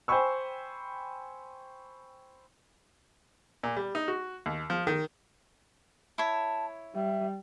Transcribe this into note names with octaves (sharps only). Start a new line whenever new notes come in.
C5 G5 G#5 B5 C#6 E6
A#2
G3
D#4
F#4
D#2
F3
D#3
E4 C#5 A5
G3 E5